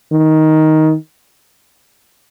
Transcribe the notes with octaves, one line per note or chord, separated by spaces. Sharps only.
D#3